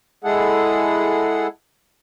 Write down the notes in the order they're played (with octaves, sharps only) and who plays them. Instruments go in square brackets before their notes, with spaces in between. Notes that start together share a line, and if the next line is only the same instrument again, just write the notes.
[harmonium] G#3 E4 G#4 A4 F#5